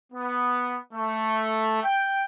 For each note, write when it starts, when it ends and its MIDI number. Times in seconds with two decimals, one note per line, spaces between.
0.12 0.77 59
0.94 1.82 57
1.83 2.23 79